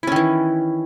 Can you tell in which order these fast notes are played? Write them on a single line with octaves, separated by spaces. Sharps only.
E4 C#4 D#3 E3